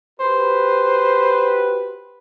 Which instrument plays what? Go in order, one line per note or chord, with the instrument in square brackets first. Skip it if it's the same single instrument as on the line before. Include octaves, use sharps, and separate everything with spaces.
[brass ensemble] F#4 G4 B4 [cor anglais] C5